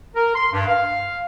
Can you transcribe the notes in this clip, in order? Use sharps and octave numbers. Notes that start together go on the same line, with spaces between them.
A#4
C6
G2
F5